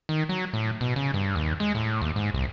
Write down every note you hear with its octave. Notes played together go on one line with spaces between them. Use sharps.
D#3
F#3
A2
B2
C#3
G2
D#2
G#3
A2
D#2
G#2
C2